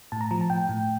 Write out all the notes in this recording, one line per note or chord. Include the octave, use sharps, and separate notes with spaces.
A2 A5
A#5
F3 A#5
A5
A2 G5
A2